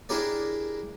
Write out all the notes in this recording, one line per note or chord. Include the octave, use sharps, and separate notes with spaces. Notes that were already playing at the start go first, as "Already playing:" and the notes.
D4 E4 G4 G#4 A#4 D5